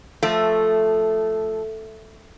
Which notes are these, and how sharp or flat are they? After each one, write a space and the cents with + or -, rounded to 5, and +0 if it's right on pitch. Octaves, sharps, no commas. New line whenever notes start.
F3 +0 A3 +0